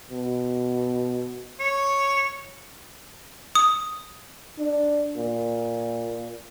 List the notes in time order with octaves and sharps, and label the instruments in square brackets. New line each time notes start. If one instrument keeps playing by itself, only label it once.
[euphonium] B2
[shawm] C#5
[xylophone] D#6
[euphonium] D4
A#2